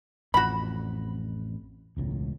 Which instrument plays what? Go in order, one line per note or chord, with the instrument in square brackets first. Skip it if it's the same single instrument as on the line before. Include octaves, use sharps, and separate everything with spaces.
[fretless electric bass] A1 F2 [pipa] F#4 B5
[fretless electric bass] E1 C#2 A2